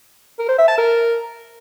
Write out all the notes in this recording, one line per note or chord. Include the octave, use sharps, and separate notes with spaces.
A#4
C5
E5
A5
A#4